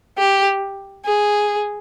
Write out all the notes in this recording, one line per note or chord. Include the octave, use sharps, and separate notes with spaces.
G4
G#4